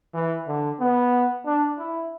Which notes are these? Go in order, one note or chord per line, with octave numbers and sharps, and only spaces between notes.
E3
D3
B3
D4
E4